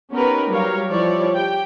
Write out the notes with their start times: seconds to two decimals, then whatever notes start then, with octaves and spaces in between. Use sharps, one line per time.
0.13 B3 C#4 D#4 G4 A#4 B4
0.50 F#3 G3 G4 A#4 C#5 F5
0.89 F3 G3 E4 C#5 D5
1.34 G4 G5